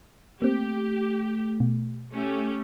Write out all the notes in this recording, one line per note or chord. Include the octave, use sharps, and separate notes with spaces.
A3 A#3 C4 G4
B2
A3 C#4 G4